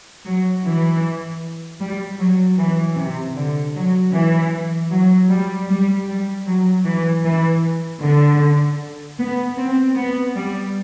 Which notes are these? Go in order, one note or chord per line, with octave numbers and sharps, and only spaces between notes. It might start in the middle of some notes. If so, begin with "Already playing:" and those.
F#3
E3
G3
F#3
E3
C3
D3
F#3
E3
F#3
G3
G3
G3
F#3
E3
E3
D3
B3
C4
B3
G3